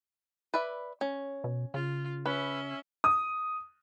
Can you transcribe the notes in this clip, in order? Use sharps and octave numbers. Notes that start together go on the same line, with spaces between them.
B4 D5 E5
C#4
B2
C#3 F4
C#4 B4 E5
D#6